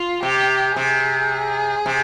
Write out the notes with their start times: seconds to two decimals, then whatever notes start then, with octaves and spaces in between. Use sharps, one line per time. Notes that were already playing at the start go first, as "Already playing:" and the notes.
Already playing: F4
0.23 C3 G4
0.76 C3 G#4
1.86 C3